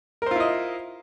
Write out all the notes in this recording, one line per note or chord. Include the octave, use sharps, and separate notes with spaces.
E4 F4 A#4 C5 D#5